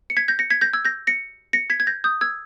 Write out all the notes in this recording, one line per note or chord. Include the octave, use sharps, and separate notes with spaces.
C#7
G#6 B6
G6 A#6
A#6 C#7
G#6 B6
G6 A#6
E6 G#6
G6 A#6
A#6 C#7
A#6 C#7
G#6 B6
G#6
G6 A#6
D#6 G6
E6 G#6